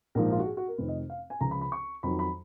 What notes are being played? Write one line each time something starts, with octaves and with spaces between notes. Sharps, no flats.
A#1 G#2 F3 A#4
F4
F#4
G#4
F#4
A#4
F1 F2 D#3 B4
D#5
F5
G#5
C#2 C#3 F3 A#5
B5
B5
C#6
F2 D#3 F#3 B5
B5